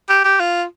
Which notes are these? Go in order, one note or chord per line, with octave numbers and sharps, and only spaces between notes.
G4
G4
F4